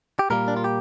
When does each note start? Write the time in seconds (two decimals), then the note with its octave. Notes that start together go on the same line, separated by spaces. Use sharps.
0.19 G4
0.30 A#2 G3 A#3 A#4
0.48 D4
0.57 F4
0.64 G4